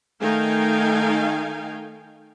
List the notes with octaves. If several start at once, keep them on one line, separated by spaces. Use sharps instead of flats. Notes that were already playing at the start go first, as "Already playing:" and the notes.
D#3 A3 D#4 F5 G5 G#5